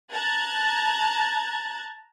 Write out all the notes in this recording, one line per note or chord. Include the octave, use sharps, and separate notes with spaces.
A5 A#5 F#6 G#6 A6